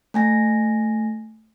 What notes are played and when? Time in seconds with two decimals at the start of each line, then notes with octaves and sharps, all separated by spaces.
0.14 A3 G#5 A#6